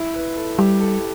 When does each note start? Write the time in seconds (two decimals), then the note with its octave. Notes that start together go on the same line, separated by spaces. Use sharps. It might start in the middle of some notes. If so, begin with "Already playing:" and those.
Already playing: E4
0.14 B4
0.36 A4
0.58 G3 G4
0.81 A4